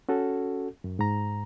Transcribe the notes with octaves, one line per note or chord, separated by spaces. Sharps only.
C#4 F#4 A4
F#2
G#2 A#5